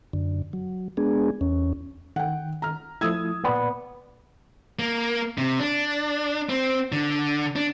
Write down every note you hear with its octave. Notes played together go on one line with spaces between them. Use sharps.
F#2 D3
F#3
G#3 B3 D4 G#4
E2 C#4
D#3 F#5 G5
A#5 F6
F3 A3 E4 D#6 E6 G#6
A#2 B3 D5
A#3
C3
D4
C4
D3
D4